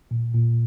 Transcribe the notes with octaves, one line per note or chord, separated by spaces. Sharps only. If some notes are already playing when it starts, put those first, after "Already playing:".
A#2
A#2